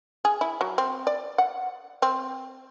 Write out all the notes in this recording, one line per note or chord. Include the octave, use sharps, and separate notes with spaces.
G#4
E4
F#3
C4
D5
F#5
C4